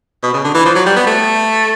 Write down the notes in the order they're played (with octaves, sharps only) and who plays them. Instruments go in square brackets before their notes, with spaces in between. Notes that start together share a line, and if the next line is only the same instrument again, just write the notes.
[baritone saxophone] B2
C#3
D3
E3
F3
F#3
G3
B3
A3